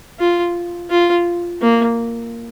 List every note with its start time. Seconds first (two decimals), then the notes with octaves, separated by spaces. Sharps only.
0.19 F4
0.90 F4
1.62 A#3